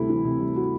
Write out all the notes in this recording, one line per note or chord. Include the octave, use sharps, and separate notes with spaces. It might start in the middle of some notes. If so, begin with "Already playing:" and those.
Already playing: D2 C3 G3 E4 A4
E3
C3
G3
F#4